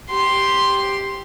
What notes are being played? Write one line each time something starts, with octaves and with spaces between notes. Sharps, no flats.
G4 C6